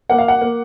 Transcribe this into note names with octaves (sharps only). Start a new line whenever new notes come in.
A#3 F#5
F5
F#5
A#3